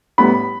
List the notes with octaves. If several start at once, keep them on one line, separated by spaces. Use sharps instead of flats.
A2 G3 B3 B5